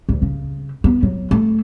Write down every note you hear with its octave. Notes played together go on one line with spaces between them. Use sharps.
D2
C#3
B3
F#3
A3